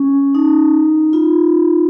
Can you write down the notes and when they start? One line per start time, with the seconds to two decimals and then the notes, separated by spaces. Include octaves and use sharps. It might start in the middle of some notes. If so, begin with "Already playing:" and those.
Already playing: C#4
0.35 D#4
1.13 F4